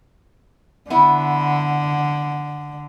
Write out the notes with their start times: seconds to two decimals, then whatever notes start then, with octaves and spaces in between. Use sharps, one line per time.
0.90 D3 B3 E4